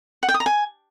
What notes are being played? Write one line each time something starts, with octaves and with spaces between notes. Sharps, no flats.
F#5
G5
D#6
A#5
G#5